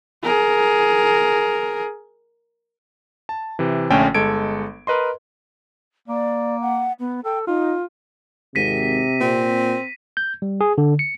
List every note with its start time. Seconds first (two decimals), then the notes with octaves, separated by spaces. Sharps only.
0.23 G#4 A#4
3.29 A5
3.59 C3 E3
3.90 A#1 D3 A3 C#4 G5 G#5
4.15 G1 G#3 A4 G#6 D7
4.87 A#4 B4 D#5 C6
6.08 A#3 D5
6.61 F#5
7.00 B3
7.25 A4 G5
7.47 D#4 F4
8.55 G#1 C3 A#6 B6 D#7
9.20 A#2 C4
10.17 G6
10.42 G3
10.61 G#4
10.78 D3
10.99 C#7